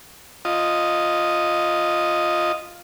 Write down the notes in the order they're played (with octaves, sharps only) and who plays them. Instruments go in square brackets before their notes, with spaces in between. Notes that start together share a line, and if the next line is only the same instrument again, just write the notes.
[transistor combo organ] F4 D#5